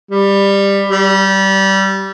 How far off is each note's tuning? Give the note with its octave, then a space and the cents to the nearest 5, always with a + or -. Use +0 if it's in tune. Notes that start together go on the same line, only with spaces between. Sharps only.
G3 +15
G3 -20